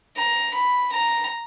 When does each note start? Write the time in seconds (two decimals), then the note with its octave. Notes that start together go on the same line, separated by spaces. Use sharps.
0.16 A#5
0.54 B5
0.92 A#5